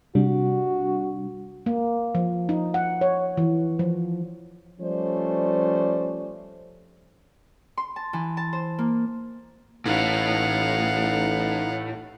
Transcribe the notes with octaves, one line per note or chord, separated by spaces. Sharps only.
C3 G3 D4 F#4
A#3
F3
D#4
F#5
C#5
E3
F3
F3 G3 A3 C#4 C5 D5
C6
A5
E3
A5
C5
A#3
A1 A2 D#4 F5 F#5